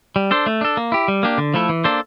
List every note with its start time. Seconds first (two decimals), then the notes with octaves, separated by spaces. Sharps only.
0.16 G3
0.31 D4 A4 C5
0.46 A3
0.61 D4 A4
0.77 A#3
0.92 E4 G4
1.08 G3
1.23 A#3 D4 G4
1.38 D3
1.54 F3 A3 E4 A4
1.69 E3
1.84 A#3 D4 A4 C5